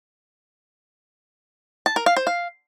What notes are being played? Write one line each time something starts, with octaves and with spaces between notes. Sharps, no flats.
A5
A#4
F5
C5
F5